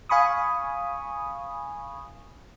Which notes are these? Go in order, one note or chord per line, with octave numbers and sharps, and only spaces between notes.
F5 G#5 B5 C#6 D#6